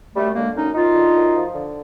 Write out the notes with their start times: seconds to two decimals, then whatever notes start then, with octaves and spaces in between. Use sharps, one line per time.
0.15 F#2 G3 A3
0.35 D3 G#3 A#3
0.55 F#2 C#4 D#4
0.75 F#2 D#4 F4
0.95 D3
1.16 F#2
1.35 F3
1.55 D3